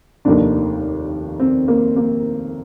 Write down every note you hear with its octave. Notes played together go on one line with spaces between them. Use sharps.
F1 D#2 D#3 A#3 D4
C4
A#3
A#3